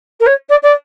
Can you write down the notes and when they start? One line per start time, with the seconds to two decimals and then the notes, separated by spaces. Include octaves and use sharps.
0.20 A#4
0.26 C#5
0.49 D5
0.62 D5